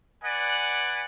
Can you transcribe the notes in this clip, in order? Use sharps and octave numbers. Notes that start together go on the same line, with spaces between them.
B4 D5 F#5 G#5